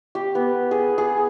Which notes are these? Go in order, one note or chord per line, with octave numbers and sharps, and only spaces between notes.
G4
B3
G#4
G#4